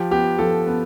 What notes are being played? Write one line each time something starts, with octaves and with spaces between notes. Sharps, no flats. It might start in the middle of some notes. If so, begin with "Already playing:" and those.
Already playing: F3 G4
B3 G4
F3 A4
B3